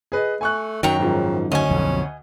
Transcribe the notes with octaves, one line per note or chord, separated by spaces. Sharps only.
G#4 B4 D#5
A3 G#5 C#6 F#6
F#2 D#3 F#3 G5 A#5 C#6
G#2 C#3 F3
D2 C#4 D#5 G#5
B1 F2